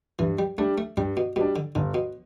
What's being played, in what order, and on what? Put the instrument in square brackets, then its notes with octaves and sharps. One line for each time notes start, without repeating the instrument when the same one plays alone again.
[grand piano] G2 [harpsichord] E3
[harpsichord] G3
[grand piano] G3 D4 [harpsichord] A3
[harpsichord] A3
[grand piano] G2 [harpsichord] G3
[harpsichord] B2
[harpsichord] B2 [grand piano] G3 D4
[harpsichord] D3
[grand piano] G1 [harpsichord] D3
[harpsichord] B2